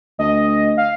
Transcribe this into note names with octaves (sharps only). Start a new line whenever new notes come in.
D2 D#5
F5